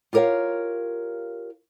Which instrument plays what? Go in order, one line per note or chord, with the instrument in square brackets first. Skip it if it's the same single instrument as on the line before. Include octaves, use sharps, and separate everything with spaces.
[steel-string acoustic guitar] F4 G4 A#4 C#5 F5